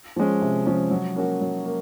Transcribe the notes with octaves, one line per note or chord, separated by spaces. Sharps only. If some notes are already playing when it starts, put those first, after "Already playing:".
F3 G#3 C#4
C3
F3 G#3 C#4
F#3
A#3 C#4 F#4
F#3
A#3